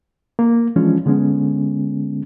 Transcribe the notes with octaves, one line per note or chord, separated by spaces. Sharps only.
A#3
E3 F3 G#3 C#4 D4 F4
D3 G#3 B3 C#4